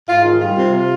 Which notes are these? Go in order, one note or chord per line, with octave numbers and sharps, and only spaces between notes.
G#2 F4
D#3
G3 F4
C3
C3